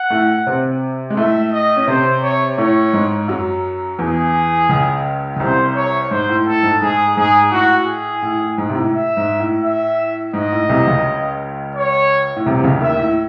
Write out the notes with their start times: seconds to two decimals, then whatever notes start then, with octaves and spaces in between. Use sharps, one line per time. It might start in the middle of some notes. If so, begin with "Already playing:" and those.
Already playing: F#5
0.10 A2 A3
0.47 C3 C4
1.10 G#3
1.17 A2 A3 E5
1.52 D#5
1.76 C#4
1.87 C3 C4 C5
2.22 C#5
2.58 A2 A3 C#5
2.93 G#2 G#3
3.28 F#2 F#3
3.99 E2 E3 G#4
4.69 C#2 C#3
5.36 C#3
5.40 C2 C3 C5
5.75 C#5
6.11 G#2 C5
6.29 A2
6.46 A2 A4
6.63 G#2
6.81 G#2 G#4
7.16 G#2 G#4
7.52 A2 F#4
7.87 G#4
8.22 A2
8.40 A2
8.58 G#2
8.69 C3
8.75 A2
8.93 E5
9.17 G#2
9.39 A2
9.63 E5
10.33 G#2 D#5
10.52 A2
10.64 A2
10.69 C2 C3
10.87 C#2 C#3
11.75 C#5
12.36 A2
12.46 C2 C3
12.59 C3
12.64 C#2 C#3
12.80 D#2 D#3 E5
12.99 A2